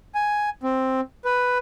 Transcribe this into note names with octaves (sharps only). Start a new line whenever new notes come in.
G#5
C4
B4